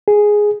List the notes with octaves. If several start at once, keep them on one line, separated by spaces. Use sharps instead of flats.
G#4